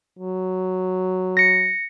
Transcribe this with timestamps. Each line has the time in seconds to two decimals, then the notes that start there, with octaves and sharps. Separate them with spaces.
0.19 F#3
1.37 A#6 C#7